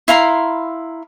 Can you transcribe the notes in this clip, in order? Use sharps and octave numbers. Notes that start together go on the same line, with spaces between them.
E4 F5 A#5 C6